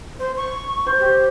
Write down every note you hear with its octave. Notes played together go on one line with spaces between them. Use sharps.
C5
C#6
C5
G4